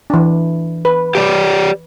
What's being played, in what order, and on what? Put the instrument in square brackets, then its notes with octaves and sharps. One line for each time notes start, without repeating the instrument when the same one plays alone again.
[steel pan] E3 D4
B4
[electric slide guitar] G4 C#5 D5